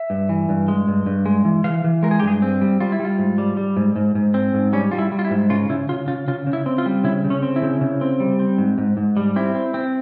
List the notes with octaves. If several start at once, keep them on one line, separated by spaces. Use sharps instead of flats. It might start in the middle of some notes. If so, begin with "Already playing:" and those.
Already playing: E5
G2
E3
G2
G#3
G2
G2
G#3
E3
E3 F5
E3
G#3 A#4
G#4
G4
G2
G#4
C4
G3
G3 F4
E4
G3
F4
G#2
G3
G3
G#2
G#2
G#2
C4
G#2
G3 C#4
G3 F4
E4
G3
F4
E4
G#2
C#3 F4
C#3 E4
C#3 F4
C#3 F4
C#3 F4
C#3
E4
C4
F4
G3
C#3 E4
C#3
C#4
C4
E4
C#3
C#3
C4
G3
C4
G#2
G#2
G#2
G3
C4 E4
C4
C4